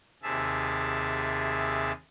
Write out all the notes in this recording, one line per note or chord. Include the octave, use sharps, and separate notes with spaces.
D#2 C3 G#4 E5 A5